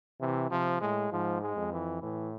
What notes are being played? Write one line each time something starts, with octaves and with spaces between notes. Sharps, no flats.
C3 E3
C3 F3
A2 G#3
G#2 F3
G#3
F2
E3
A2 E3